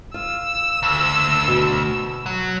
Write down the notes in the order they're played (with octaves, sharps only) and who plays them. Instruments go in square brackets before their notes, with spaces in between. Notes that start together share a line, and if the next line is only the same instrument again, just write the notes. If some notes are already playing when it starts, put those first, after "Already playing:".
[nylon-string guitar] F4 [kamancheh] E6
[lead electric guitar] D2
[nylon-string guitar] B2
[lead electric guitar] F#3